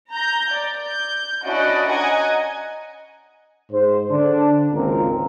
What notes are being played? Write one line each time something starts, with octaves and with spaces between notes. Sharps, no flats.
A#5 G6
D5
G6
C#4 D4 E4 F#4 D5 D#5
D#5 F#5 G#5 A#5
G#2 C5
D3 D4
G#1 C#2 A#3 C4 F4 A#4